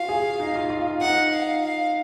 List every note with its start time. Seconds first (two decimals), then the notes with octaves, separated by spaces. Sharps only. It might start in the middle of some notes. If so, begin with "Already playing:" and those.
Already playing: F4 F#4 F5
0.09 G#4
0.40 D#4
0.56 F4
0.70 F4
0.87 F4
1.02 D#4 F#5
1.34 F5
1.64 F5